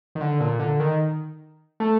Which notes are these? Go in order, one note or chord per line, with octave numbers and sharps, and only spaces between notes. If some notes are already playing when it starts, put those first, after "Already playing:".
D#3
D3
A#2
D3
D#3
A3